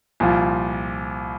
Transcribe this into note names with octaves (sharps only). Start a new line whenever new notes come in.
C2 A#2 F3